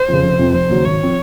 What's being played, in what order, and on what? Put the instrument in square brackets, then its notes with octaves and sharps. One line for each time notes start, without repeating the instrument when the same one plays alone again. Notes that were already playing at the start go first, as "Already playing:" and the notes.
Already playing: [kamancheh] C5
[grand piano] F2 C#3
F1
F2 C3 F3 C4
[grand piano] F1 [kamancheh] C5
[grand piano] D#2 C#3 F#3
[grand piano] G#1 [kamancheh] C#5
[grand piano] F3 C4